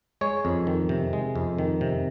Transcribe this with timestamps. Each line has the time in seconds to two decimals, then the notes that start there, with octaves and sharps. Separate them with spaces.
0.21 G#3 C#5
0.45 F2
0.67 D#3
0.89 C3
1.13 G#3
1.35 F2
1.58 D#3
1.81 C3